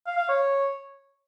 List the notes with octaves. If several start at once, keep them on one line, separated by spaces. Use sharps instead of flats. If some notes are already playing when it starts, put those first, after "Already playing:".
F5
F5
C#5